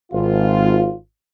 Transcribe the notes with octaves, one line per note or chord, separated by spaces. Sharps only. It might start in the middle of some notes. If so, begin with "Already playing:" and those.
G#1 F4